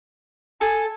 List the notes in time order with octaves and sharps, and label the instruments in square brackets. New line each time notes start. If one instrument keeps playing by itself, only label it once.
[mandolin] A4 [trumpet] G#5